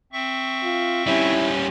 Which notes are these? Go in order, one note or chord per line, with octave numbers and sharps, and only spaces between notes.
C4 E5 C#6
F4
G3 C#4 E4